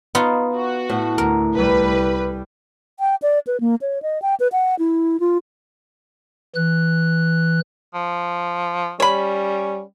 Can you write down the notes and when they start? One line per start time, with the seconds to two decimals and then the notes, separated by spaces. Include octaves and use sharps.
0.15 B3 D#4 F4
0.55 F#4
0.89 A2
1.18 D2 A#4
1.56 C2 G3 B4
3.00 G5
3.22 D5
3.47 B4
3.60 A#3
3.81 C#5
4.02 D#5
4.22 G5
4.40 B4
4.52 F#5
4.79 E4
5.20 F4
6.55 E3 F#6
7.94 F3
9.00 G3 C#4 C#5 B5